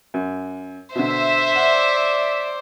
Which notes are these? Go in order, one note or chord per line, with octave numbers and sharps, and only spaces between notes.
F#2
B2 D3 C5 E5
D5 F#5